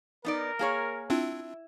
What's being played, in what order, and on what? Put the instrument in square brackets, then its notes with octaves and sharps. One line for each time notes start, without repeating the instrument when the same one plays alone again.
[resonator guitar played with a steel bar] B3 D#4 D5 [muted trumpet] A#4
[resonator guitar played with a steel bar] A#3 G#4 C#5
[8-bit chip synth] C4 D4 F4 [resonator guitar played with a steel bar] E4